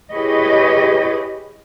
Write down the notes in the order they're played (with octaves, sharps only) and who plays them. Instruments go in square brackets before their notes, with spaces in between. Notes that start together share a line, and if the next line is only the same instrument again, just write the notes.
[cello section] E4 G4 G#4 B4 C#5 D#5